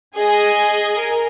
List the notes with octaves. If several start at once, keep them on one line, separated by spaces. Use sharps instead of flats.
G#4 D#5 G#5
A#4